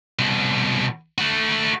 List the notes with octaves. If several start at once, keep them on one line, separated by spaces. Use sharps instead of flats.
C2 B2
A3 F#4